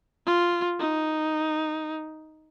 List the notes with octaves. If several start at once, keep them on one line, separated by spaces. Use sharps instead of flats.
F4
D#4